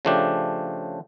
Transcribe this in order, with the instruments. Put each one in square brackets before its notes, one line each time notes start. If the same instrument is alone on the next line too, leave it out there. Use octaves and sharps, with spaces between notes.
[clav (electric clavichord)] C#3 F3 A3 D4 G4